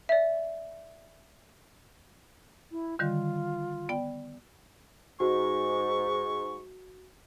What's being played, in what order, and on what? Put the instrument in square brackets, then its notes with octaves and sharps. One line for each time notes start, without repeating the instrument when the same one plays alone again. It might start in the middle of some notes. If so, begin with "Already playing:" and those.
[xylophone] D5 E5
[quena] E4
[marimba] D3 D#3 G3 [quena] F4
[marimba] B3 D5 G5
[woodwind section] G#2 [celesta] F#4 [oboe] C#6